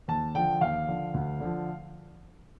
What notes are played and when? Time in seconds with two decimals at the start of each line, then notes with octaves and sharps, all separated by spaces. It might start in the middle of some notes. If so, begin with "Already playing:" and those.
0.08 D#2 A5
0.35 D3 F3 G5
0.61 D#2 F5
0.88 D3 F3
1.14 D2
1.41 D3 F3